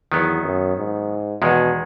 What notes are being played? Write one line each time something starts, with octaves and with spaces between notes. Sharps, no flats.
E2 D#3 F#3 B3
F#2
G#2
E2 B2 D#3 G#3